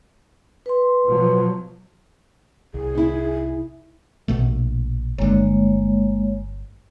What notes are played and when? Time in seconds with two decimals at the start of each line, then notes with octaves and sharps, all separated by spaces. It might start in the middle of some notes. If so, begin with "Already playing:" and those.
0.66 B4 C6
1.07 B2 F3 F#3
2.74 C2 G#4
2.95 D#4 E4
4.28 A#1 B2 A3
5.18 G1 D3 G#3 A#3 C#5